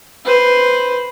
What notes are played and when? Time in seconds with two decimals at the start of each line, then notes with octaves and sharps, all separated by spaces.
0.25 B4 C5